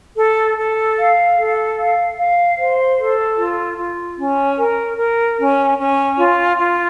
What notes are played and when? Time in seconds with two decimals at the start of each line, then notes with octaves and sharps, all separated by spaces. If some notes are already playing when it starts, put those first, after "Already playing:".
0.17 A4
0.57 A4
0.97 F5
1.37 A4
1.77 F5
2.18 F5
2.58 C5
2.98 A4
3.38 F4
3.77 F4
4.18 C#4
4.58 A#4
4.97 A#4
5.38 C#4
5.78 C#4
6.18 F4
6.58 F4